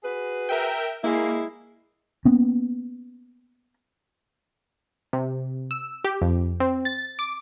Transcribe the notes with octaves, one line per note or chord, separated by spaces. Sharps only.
F#4 G#4 B4
A#4 E5 G5
G#3 A#3 E4 C7
A#3 B3 C#4
C3
E6
G4
F2
C4
A6
D6